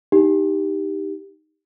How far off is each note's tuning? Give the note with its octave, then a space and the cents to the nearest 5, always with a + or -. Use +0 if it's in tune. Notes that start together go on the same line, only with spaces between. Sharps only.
D#4 +10 G4 +0